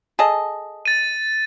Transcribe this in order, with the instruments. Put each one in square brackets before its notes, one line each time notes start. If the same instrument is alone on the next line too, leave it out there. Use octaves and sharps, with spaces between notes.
[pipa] G#4 A4 D#5
[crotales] A6 D#7